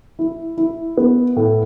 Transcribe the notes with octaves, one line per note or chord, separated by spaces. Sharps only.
E4
E4
B3
A2